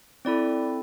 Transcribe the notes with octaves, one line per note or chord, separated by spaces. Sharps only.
C4 E4 A4 D5